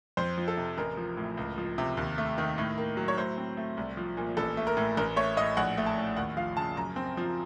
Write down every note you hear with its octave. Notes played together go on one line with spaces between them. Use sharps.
F2 C5
F3
A4
C3
A1 A#4
F3
A2
C#2
F3
C3
D#2
A3
D#3
A2
A#3
F#3
C#5
A2 C5
C4
A3
C2
F3
A#2
A1 A4
A3
A#4
A2
A1 A#4
A3 C#5
A2 D#5
A#1 F#5
A3
A5
A2
D#2 F#5
F3 F5
C#3 A5
F#2 A#5
C4
F3